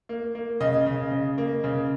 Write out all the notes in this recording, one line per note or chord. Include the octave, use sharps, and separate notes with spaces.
A#3
A#3
C#3 D#5
C#3
C#3
A#3
C#3